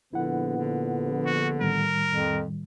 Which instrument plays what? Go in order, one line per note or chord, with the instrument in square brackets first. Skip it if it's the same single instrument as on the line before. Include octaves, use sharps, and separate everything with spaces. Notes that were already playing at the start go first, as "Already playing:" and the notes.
[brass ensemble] A#1 B3 [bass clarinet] D3 [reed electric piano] E4 F#5
[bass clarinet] D3
[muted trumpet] F#4
[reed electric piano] A2 D#3 G3 [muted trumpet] A#4
[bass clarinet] F2